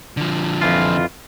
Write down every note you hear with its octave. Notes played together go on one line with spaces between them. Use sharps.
D3 F3
F2 E3 F4